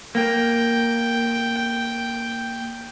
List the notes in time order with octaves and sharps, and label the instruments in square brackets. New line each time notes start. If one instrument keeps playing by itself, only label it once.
[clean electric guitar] A#3 [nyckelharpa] G5